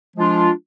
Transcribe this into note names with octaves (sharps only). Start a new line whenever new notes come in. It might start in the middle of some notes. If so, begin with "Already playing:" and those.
F3 G#3 D4 F4